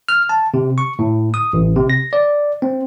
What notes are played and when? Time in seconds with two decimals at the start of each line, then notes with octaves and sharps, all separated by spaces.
0.09 F6
0.29 A5
0.54 C3
0.78 C#6
0.99 A2
1.34 D#6
1.53 A1
1.76 C3
1.90 A#6
2.13 D5
2.62 C4